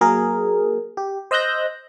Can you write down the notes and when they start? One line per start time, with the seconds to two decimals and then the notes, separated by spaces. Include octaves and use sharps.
0.01 F#3 A#3 G#4 A#4
0.97 G4
1.31 C5 D#5 E6 F#6 G6 A#6